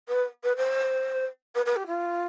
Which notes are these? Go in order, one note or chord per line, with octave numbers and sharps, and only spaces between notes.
B4
B4
C5
B4
B4
G4
F4